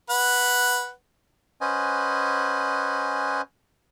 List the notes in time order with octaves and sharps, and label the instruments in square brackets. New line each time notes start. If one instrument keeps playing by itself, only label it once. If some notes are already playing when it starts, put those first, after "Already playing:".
[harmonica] B4 F#5
[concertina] C#4 B4 C5 D#5 F#5 G#5